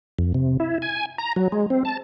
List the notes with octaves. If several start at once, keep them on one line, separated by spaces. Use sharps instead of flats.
F2
C3
E4
G#5
A#5
F#3
G#3
C4
A5